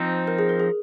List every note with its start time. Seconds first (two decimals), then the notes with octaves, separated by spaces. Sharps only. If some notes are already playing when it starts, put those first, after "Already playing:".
Already playing: F3 C4 D#4
0.27 A#4
0.39 G#4
0.49 A#4
0.60 G#4